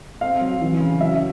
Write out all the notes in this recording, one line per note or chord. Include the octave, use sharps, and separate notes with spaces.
C4 F5
F#3
E3
C#3
F#3 E5